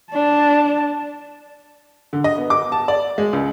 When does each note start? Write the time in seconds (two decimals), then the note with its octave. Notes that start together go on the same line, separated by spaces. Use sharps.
0.12 D4 A5
2.13 D3
2.24 D#5
2.38 B3
2.50 D6
2.72 A5
2.88 D5
3.18 G#3
3.33 C#2